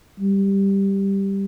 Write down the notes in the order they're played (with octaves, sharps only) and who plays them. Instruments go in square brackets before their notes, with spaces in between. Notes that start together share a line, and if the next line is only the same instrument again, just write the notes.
[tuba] G3